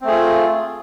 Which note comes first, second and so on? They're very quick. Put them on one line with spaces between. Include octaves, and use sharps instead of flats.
C4 A3 G#4 F4